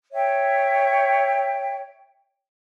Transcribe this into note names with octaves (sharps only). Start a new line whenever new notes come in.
C#5 E5 G5